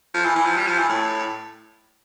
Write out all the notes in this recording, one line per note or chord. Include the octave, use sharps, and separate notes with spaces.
F3
E3
E3
F3
G3
F3
E3
A2